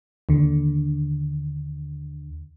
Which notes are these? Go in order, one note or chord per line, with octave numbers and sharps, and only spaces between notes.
D#2 D3